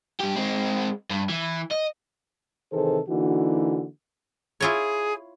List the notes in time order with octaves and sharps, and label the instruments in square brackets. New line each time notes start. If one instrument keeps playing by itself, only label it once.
[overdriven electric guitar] G2 G4
G#3 C4
G2
E3
D#5
[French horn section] C3 D#3 E3 G#4 A4 C5
D3 E3 A#3 D#4 F#4
[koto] E4 F4 C#5 [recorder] G#4